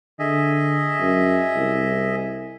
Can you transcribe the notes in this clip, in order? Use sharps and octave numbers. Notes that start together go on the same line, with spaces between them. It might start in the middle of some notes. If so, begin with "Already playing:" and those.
D3 G#4 D#5 E5
F#2
C2